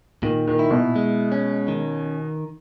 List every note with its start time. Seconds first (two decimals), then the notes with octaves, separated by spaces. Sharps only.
0.23 A#2 D#3
0.47 D#3
0.59 E4
0.71 B2
0.96 G#3
1.32 C#4
1.68 D#3